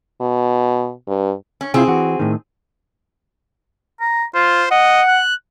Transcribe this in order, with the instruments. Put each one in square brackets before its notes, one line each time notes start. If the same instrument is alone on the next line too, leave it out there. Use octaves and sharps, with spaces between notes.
[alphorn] B2
G2
[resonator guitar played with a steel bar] C#4
[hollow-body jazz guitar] C3 E4 F4 [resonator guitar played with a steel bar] C4 G#4
[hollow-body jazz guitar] E3 F#4
A2 D#3
[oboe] A#5
[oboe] F4 [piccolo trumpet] C5
[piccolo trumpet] D#5 [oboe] F#5
[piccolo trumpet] F#6